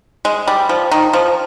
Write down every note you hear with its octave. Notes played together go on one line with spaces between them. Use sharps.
G#3
G3
F3
D#3
F3